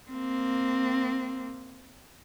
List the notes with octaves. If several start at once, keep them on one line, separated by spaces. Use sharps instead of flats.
A#3 C4